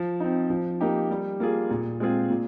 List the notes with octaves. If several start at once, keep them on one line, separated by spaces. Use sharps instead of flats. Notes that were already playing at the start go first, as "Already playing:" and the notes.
Already playing: F3
C4 D#4
F3
A#3 D#4 G4
G3
A#3 F4 G#4
A#2
G#3 C4 F4 G#4
A#2